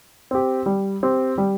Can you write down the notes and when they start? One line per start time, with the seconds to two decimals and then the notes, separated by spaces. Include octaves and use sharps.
0.31 C4 G4
0.66 G3
1.03 C4 G4
1.38 G3